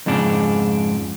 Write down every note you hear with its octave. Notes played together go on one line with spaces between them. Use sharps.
F2 G#2 C#3 D4